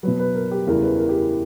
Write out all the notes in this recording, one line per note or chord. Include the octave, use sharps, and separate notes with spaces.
B2 F#3 B4
B4
A#4
G4
E2 C#3 E3 G3 A#4
B4
A#4
G4
A#4